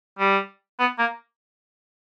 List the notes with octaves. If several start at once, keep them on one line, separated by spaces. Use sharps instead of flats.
G3
B3
A#3